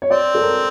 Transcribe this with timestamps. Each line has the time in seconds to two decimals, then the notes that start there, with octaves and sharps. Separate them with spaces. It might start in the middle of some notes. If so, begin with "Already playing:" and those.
0.02 C#5
0.10 C4 D5
0.35 A4
0.41 A#4